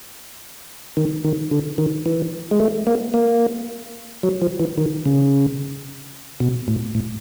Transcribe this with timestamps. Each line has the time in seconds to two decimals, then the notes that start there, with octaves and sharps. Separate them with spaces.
0.97 D#3
1.24 D#3
1.51 D3
1.78 D#3
2.06 E3
2.51 G#3
2.60 A3
2.87 A#3
3.14 A#3
4.23 F#3
4.42 F3
4.60 E3
4.78 D#3
5.05 C#3
6.40 B2
6.68 A2
6.95 A2